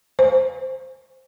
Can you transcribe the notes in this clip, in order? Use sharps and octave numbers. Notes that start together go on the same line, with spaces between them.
C5